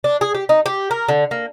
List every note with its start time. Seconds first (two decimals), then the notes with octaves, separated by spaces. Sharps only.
0.04 D4
0.21 G#4
0.35 G4
0.49 D#4
0.66 G4
0.91 A#4
1.09 D3
1.31 A#3